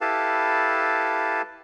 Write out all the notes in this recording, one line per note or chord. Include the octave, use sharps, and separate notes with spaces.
E4 G4 A4 B4 F5 A5